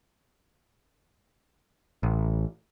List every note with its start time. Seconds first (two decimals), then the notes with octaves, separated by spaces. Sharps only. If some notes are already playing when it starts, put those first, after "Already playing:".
2.03 A1